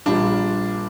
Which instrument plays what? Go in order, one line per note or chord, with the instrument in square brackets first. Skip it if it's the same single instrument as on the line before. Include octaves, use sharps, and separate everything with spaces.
[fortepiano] A#1 A#2 G3 A#3 F4 [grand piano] D4